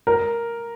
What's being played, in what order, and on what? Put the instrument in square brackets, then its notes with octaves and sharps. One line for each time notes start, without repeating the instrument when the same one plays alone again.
[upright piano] A#4